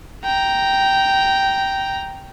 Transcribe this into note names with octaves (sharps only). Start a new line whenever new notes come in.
G5 A#5